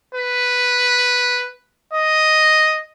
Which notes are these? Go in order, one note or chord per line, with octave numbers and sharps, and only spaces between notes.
B4
D#5